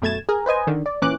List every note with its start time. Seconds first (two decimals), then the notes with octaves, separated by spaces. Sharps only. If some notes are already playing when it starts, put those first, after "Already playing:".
0.02 F#2 B2 A3 G#6 A6 E7
0.29 G#4 A#4
0.46 B4 C5 D#5 G#5
0.67 D3 D#3
0.86 D5
1.02 A#2 E3 C#4 D6 F#6